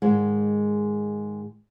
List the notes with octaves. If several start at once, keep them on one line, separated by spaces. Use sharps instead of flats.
G#2 D#3 G#3